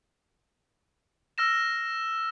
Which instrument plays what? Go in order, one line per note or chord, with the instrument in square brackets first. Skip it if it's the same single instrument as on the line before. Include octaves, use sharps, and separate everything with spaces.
[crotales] E6 F6 A#6 E7